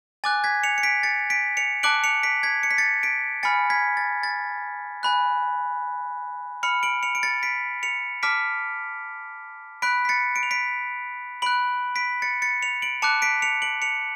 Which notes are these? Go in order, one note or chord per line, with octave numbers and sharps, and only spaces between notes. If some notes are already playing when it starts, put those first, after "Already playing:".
G#5 D6 F#6 A6
G#6 B6
C#7 F7
C#7
B6 D7
A6 C#7
B6 D7
C#7 F7
A5 D6 F#6 D7 F#7
C#7 F7
B6 D7
G#6 B6
C#7
B6
A6 C#7
B6 D7
G#5 B5 F6 A6 C#7
G#6 B6
A6
A6
G#5 B5 F#6
B5 F6 C#7 F7
D7 F#7
C#7 F7
D7
A6 C#7
B6 D7
C#7 F7
A5 D6 F6 B6 D7
B5 F#6 B6 D7
B6
A6 C#7
D7
F7
B6 D7
B5 F#6 D7 F#7
B6 D7
A6 C#7
A6 C#7
C#7 F7
D7 F#7
A5 D6 F#6 C#7 F7
B6 D7
C#7 F7
D7 F#7
C#7 F7